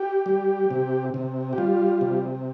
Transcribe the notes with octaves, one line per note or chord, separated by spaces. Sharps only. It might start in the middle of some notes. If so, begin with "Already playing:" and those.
Already playing: G4
G3
C3
C3
G4
G3 F4
C3